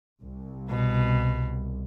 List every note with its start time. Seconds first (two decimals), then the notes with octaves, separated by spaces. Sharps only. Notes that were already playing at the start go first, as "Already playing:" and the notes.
0.21 C2
0.70 B2